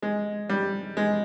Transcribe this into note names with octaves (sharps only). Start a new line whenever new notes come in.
G#3
G3
G#3